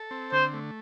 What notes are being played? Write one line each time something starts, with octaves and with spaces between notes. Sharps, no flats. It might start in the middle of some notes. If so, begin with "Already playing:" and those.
Already playing: A4
C4
D3 C5
A3